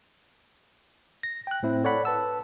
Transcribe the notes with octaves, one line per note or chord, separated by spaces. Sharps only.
A#6
G5 F#6
A2 C4 E4
A4 C#5 D5 F#5 B5
B4 A5 E6